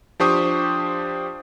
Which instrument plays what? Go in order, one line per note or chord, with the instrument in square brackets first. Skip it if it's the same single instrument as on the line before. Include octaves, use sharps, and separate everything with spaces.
[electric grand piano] F3 D4 G4 C5 C#6 D#6